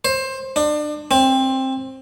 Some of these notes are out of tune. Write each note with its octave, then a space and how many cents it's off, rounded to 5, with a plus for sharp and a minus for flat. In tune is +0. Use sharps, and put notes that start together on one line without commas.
C5 +20
D4 +30
C4 +15